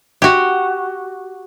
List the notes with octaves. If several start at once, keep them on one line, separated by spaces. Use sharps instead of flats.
F#4 G4